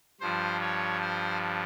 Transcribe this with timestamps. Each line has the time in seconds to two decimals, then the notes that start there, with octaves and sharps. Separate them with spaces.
0.20 G2 F3 C5
0.61 C#5
1.02 C5